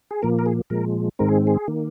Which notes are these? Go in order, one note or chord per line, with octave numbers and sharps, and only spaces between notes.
G#4
A#2 F3 A#3 A#4
A#4
G#4
A#2 F3 G#3 A#4
G#2 D#3 G#3 C4 A#4
G#4
G#4
D#3 A#3